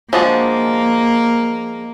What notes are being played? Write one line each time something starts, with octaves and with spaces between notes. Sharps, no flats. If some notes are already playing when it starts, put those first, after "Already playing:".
F3 G#3 A#3 D4 F#4